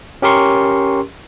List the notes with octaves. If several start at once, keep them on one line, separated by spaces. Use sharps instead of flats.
C#4 G4 A#4 C6 C#6